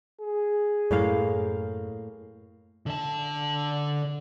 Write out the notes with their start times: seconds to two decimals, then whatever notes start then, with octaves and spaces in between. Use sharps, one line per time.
0.21 G#4
0.91 F#2 A2 A#3 F5
2.86 D3 A5